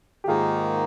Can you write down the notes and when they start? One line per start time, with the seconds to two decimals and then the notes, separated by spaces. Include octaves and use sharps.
0.24 G4
0.27 G#2 D#3 A#3 D#4 F4 G#4